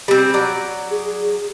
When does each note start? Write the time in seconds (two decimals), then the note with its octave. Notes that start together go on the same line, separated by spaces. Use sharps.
0.08 G3 C4
0.34 F#3 D5
0.91 G#4